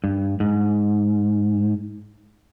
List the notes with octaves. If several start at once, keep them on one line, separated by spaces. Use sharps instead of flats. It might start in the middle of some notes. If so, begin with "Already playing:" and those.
G2
G#2